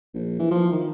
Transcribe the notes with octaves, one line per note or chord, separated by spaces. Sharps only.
A#1
E3
F3
D#3